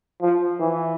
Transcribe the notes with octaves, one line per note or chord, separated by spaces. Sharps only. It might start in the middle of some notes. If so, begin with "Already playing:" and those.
F3
E3